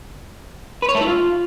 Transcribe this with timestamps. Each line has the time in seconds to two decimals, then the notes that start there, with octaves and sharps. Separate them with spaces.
0.82 B4
0.89 C#5
0.95 A3
1.01 E4
1.07 F4